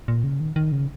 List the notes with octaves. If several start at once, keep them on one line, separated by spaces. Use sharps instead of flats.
A#2
C#3
D#3
D#3
C#3